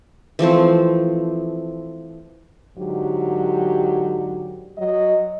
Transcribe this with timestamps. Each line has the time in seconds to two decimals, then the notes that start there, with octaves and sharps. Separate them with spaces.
0.39 E3 F3 A3 C4
2.77 G#2 D3 F#3 G4
4.77 F#3 D#5